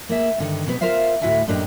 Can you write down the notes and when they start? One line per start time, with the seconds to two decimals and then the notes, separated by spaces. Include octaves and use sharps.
0.09 A#3 G#4 E5
0.38 G2 D3 D#3
0.67 B2 G3 B3 C4
0.81 F4 A#4 C5 E5 F5
1.21 D2 A2 E4 F#4 E5 G#5
1.48 F#2 A2 A#3 D4 G4 D#5